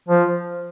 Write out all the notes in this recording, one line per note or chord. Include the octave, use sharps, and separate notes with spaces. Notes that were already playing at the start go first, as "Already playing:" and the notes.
F3